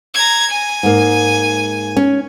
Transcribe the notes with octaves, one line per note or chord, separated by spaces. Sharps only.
A#5 G#6
G#5
G#2 A#3
C#4